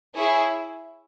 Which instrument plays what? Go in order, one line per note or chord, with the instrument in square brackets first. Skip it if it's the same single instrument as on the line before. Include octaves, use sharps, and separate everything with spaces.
[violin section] E4 G#4 C#5 E5